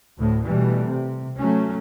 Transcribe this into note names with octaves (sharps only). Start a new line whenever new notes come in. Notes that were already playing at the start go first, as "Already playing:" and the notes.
D2 A2
B2 E3 G3 A3
C3
F#3 A3 C#4